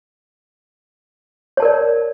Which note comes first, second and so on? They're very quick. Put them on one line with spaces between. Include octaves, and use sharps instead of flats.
C#5 A5 A#4 D5